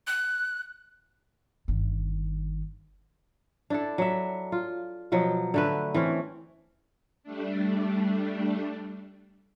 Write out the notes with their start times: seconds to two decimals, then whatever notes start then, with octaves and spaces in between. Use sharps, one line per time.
0.07 F#6
1.68 G1 D#3
3.70 D4 E4 A4
3.98 F#3 E5
4.52 F4
5.12 B2 F3 F#3
5.54 D3 A3 B4
5.94 E3 C4 C#4
7.23 G3 A3 D4